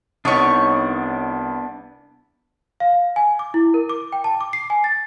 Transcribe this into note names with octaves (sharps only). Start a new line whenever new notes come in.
C2 B3 D4 D#4 C#5 C#6
F5
G#5
D6
E4
A#4
D6
G5
A5
D6
C7
G#5
A6